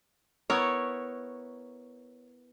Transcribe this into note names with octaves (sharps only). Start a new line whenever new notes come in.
B3 E4 A#4 C#5